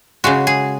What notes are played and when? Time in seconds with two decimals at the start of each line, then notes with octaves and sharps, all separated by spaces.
0.24 C#3 G#3 F#4
0.47 G#4